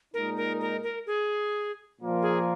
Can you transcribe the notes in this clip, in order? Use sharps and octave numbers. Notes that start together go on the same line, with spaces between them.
A#2 G#3 D#4 A#4
A#4
A#4
A#4
G#4
A#2 F3 A#3 F4 A#4
G#4